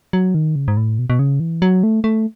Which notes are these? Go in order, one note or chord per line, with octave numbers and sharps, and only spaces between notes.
F#3
D#3
C#3
G#2
A2
B2
B2
C#3
E3
F#3
A3
A3